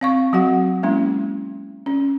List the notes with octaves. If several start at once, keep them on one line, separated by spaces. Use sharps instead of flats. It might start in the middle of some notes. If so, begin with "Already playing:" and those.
C4 F5 C#6
F#3 C4 F#4 F#5
G#3 A#3 C#4 E4
C#4